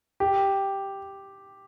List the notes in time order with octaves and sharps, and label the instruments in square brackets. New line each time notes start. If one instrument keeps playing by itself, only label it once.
[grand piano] G4